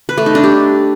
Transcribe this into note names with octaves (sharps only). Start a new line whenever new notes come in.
B4
A3
D#4
D4
G4